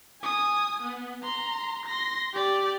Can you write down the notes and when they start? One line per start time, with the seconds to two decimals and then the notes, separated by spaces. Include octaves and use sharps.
0.21 G#5 D#6
0.82 B3
1.23 A#5 C6
1.86 C6 A#6
2.34 G4 D5